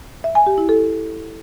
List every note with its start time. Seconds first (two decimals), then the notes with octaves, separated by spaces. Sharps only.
0.24 E5
0.35 G#5
0.47 G4
0.58 E4
0.69 A4